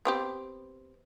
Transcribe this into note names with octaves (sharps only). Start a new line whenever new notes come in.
B3 C4 G4